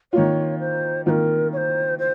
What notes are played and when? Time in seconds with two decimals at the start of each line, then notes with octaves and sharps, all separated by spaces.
0.13 D#3 A#3 F4 C#5
0.60 C5
1.06 D#3 A#3 F4 A#4 C5
1.53 C#5
1.57 C5
1.99 C5